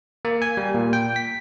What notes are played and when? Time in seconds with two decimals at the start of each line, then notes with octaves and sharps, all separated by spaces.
0.25 A#3
0.42 G#5
0.57 G3
0.74 A#2
0.93 G5
1.16 B6